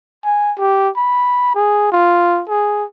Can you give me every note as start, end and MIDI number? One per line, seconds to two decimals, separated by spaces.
0.24 0.53 80
0.58 0.89 67
0.96 1.54 83
1.55 1.88 68
1.92 2.42 65
2.49 2.84 68